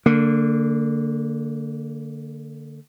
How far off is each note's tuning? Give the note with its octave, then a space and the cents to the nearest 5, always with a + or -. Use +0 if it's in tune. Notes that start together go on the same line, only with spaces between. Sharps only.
D3 +0 A#3 -30